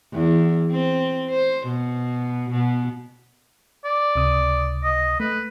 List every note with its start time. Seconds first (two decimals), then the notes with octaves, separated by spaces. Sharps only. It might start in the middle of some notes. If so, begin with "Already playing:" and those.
0.14 E2
0.72 C4
1.30 C5
1.68 B2
2.51 B2
3.85 D5
4.15 C#2 C3 D#6
4.84 D#5
5.20 A3 B4